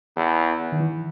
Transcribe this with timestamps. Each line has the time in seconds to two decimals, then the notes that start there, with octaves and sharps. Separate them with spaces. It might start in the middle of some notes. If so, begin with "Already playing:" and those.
0.16 E2
0.72 D#3
0.80 E3